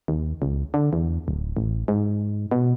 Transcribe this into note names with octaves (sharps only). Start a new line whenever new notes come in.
D#2
C#2
D3
E2
D1
A1
G#2
B2